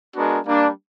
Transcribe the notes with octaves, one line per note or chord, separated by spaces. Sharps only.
G#3 B3 D4 F#4 A#4
G3 A#3 D4